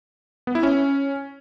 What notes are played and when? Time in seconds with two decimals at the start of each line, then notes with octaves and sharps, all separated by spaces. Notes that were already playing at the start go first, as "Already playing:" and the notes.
0.47 B3
0.55 E4
0.63 C#4